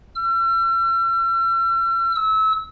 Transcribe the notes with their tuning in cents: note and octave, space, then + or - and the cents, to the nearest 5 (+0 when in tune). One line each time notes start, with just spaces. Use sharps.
E6 +45
E6 -25